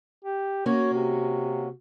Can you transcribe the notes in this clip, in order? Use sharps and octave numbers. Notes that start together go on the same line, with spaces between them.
G4
A#3 C#4 F#4 C#5
C3